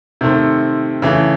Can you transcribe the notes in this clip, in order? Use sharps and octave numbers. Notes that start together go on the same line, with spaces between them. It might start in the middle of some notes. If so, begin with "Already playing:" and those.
C3 D#3 A3 C4
C#3 E3 A3